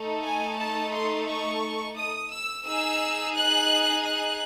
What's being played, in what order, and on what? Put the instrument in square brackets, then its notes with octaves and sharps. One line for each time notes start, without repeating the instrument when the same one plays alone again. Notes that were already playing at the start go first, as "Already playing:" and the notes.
Already playing: [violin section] A3 D#4 A4
G#5
A5
C6
C#6
D#6
E6
D#4 G#4 E6
F#6
F#6